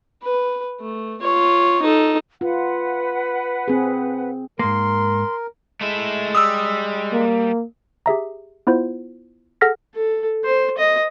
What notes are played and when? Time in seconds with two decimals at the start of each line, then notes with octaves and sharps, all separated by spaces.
0.23 B4
0.81 A3
1.22 F4 C#5
1.82 D#4 A4
2.41 F4 B4 F#5
3.68 C4 G#4
4.59 G#2 A#3 A#4 C6
5.81 G#3 A3 E4
6.35 G3 D#6 E6
7.12 A#3
8.06 G4 G#4 E5 A#5
8.67 B3 E4 F4 C5
9.61 G#4 A4 F#5 F6 A#6 B6
9.95 A4
10.44 C5
10.78 D#5